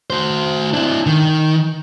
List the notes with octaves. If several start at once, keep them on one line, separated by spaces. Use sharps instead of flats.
F#4 C5
D4 E4
D#3